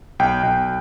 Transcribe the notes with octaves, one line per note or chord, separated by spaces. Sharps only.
B1 G5
B1